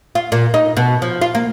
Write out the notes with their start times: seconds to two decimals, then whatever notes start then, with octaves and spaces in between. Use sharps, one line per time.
0.15 F4
0.32 A#2
0.54 D#4
0.77 B2
1.02 F3
1.21 F4
1.35 A#3